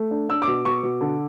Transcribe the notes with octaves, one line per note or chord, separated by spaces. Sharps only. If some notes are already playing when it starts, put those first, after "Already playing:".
Already playing: A3
D4
D4 E6
D6
B2
B2 C#6
B2
D3